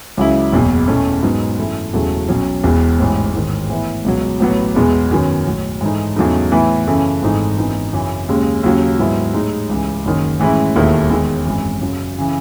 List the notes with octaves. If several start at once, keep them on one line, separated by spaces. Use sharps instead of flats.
C#2 C#3 F#3 C#4 E4
F#1 E2 B2
E2 B2 A3 C#4
G#2 F#3 B3 D#4
F#2 E3 A3 E4
E1 E2 C#3 F#3 A3
B1 B2 F#3 C#4
E1 E2 B2
A1 G#2 E3
A1 G#2 D#3
A2 E3 B3 E4
C#2 B2 F#3
A1 A2 F#3 B3
E2 B2 G#3 B3
F#2 D#3 F#3 B3
B1 A2 F#3
G#2 E3 A3 D#4
E2 C#3 F#3 A3 D#4
A2 E3 B3 E4
F#2 C#3 E3 A3
G#1 G#2 E3 A3 D#4
G#1 F#2 E3 B3 D#4
F#2 C#3 E3
D#2 C#3 G#3
D#2 C#3 F#3
G#2 F#3 B3 E4
A2 G#3 D#4
C#2 C#3 E3
F#1 F#2 D#3
A2 E3 G#3 C#4 E4
E1 D#2 D#3 A3 E4
E2 D#3 G#3
G#1 F#2 E3
F#2 C#3 F#3
C#3 E3